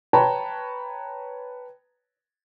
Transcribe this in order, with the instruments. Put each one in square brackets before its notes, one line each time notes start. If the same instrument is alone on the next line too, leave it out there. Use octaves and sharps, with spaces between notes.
[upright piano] B4 C#5 G5 A5 A#5